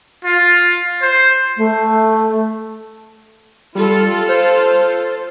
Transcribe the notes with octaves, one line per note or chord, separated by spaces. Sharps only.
F4
C5
A3
G3 F4 A4
C5